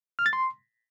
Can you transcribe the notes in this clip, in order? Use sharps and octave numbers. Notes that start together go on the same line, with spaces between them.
F6
A6
C6